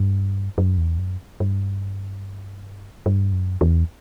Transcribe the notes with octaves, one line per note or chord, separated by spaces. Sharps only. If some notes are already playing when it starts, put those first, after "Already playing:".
Already playing: G2
F#2
E2
F#2
G2
G2
F#2
E2